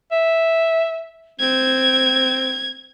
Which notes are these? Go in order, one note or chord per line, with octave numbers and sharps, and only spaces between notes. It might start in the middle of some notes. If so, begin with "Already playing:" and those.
E5
C4 G#6